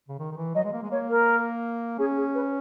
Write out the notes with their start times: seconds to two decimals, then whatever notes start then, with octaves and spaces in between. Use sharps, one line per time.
0.09 C#3
0.19 D#3
0.31 D#3
0.37 E3
0.55 F#3 D#5
0.64 G#3
0.73 A#3
0.83 G#3
0.91 A#3 C#5
1.09 A#4
1.99 C#4 G#4
2.17 G#4
2.35 B4